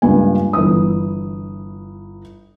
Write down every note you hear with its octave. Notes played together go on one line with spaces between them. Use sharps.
C#2 G2 A#3 G#5
G1 E3 D#6